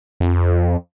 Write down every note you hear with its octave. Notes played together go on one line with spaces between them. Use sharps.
F2